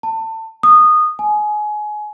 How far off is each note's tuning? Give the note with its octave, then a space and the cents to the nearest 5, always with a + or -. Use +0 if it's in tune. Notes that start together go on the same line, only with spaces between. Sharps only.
A5 +25
D#6 -15
G#5 +25